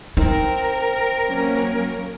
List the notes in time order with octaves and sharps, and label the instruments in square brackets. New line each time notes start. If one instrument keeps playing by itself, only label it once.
[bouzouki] C4 [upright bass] D#4 [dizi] A#4
[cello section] F#3 A#3 C#4